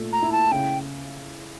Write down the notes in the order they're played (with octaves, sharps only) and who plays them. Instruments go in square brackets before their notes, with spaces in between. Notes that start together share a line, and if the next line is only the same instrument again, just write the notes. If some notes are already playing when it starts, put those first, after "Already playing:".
Already playing: [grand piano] A#2 A3 A4
[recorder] A#5
[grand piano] E4
[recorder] A5
[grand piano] C#3 [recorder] G5